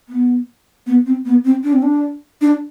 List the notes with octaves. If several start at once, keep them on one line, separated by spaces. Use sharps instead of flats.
B3
B3
C4
B3
C4
D4
C4
D4
D4